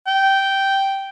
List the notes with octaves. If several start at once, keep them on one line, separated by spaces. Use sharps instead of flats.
G5